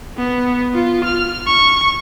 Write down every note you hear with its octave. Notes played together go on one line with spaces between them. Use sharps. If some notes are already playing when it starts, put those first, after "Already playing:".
B3
F4
F6
C#6